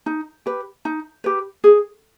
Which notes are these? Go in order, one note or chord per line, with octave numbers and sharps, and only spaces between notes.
D#4
G4 B4
D#4
G4 B4
G#4